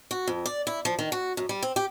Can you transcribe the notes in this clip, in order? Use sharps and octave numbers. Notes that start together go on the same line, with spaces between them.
F#4
F2
D5
E4
F3
D#3
F#4
F#2
G3
C4
G4